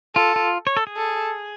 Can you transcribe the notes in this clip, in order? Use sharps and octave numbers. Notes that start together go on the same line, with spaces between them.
F4 A4
F4
C#5
A4
G#4
A4